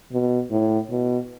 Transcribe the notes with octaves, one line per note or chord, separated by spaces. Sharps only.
B2
A2
B2